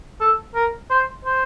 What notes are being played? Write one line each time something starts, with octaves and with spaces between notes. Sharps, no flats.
A4
A#4
C5
C5